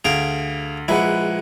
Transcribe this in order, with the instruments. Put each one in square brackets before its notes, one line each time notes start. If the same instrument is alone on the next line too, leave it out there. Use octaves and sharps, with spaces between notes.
[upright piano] D2 [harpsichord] G#4 F5 G5
[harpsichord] A#1 E4 [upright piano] G#3 B4 F#5